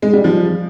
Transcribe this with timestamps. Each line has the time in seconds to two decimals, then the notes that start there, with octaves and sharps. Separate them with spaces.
0.02 G#3
0.13 G3
0.24 F3